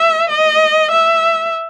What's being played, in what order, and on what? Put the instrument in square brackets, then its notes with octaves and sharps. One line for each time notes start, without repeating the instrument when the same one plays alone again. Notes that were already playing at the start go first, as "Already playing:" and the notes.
Already playing: [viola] E5
D#5
E5